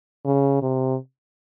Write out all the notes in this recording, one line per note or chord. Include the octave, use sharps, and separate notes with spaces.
C#3
C3